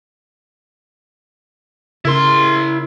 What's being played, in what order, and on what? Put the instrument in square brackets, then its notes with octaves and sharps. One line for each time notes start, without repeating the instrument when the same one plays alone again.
[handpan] C#3 A#4 [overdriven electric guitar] E4 C6